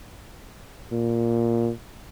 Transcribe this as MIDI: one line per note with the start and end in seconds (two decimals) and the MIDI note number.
0.92 1.71 46